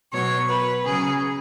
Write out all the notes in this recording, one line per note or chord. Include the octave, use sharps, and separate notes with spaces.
B2 F#3 C#5
B4
C#3 F#3 G#4